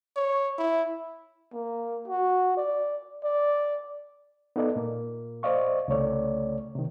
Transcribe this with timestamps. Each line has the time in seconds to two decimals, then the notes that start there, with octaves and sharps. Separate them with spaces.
0.16 C#5
0.58 E4
1.53 A#3
2.08 F#4
2.57 D5
3.24 D5
4.56 B3 D#4 A4 D5 D#5
4.76 A#2 A#3
5.43 C5 D5 D#5 F5 C#6
5.88 C2 C#3 A3 C#5 D5
6.75 C3 D#3